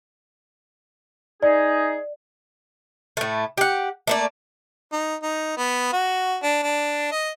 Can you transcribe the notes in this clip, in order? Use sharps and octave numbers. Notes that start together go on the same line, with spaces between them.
D#4 G#4 D5
A2 A3
G4 F#5
A3 A#3 D5
D#4
D#4
B3
F#4
D4
D4
D#5